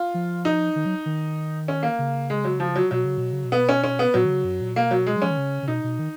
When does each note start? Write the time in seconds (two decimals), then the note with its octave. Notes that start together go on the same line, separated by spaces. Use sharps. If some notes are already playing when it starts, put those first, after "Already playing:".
Already playing: F4
0.14 F3
0.45 D#4
0.76 D#3
0.85 F#3
1.06 D#3
1.68 C#4
1.83 A#3
1.99 C#3
2.30 G#3
2.44 F#3
2.60 F3
2.76 F#3
2.91 B2 F#3
3.05 C#3
3.18 B2
3.32 C#3
3.45 B2
3.52 B3
3.69 C#4
3.84 C#4
3.99 B3
4.14 A#2 F#3
4.25 D#3
4.29 C#3
4.44 F#2
4.61 A#2
4.75 B2 A#3
4.91 F#3
5.07 G#3
5.16 F#3
5.22 F3 C#4
5.31 D#3
5.38 C#3
5.63 C#3
5.68 B2 D#4
5.84 B2
5.99 D#3